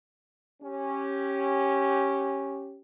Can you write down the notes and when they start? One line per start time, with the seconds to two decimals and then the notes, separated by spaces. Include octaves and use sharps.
0.63 C#4 G4